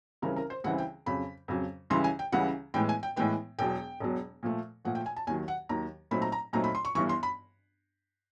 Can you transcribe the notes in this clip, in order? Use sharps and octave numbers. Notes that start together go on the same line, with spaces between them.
C#2 C#3 E3 G3 C4 A#4
A#4
C5
C#2 C#3 E3 G3 C4 F#5
G5
F2 C#3 F#3 B5
F2 C#3 F#3
C#2 C#3 E3 G3 C6
G#5
G5
C#2 C#3 E3 G3 F#5
A2 E3 G#3 B3 G5
G#5
G5
A2 E3 G#3 B3 G5
E1 E2 B2 F#3 G5
E1 E2 B2 F#3
A#2 F3 A3
A#2 F3 A3 F#5
G5
G#5
A5
D#2 D#3 F#3 G#5
F#5
D#2 D#3 F#3 A#5
A#2 F#3 A3 C4 D#4 B5
A#5
A#5
A#2 F#3 A3 C4 D#4 A#5
B5
C6
C#6
G1 G2 E3 C#6
C6
B5